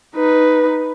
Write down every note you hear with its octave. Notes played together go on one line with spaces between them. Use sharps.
D#4 B4